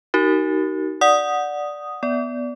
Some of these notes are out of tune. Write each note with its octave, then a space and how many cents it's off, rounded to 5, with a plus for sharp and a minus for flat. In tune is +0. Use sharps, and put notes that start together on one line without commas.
D#4 +0 F#4 +40 A#4 -10
D5 +0 F#5 -10 D#6 +0
B3 +0 D5 -15